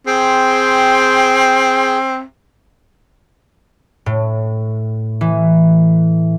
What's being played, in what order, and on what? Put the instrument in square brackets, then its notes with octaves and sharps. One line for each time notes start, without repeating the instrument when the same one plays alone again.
[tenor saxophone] C4 [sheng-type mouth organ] G#4 G5 C6
[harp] A2
E3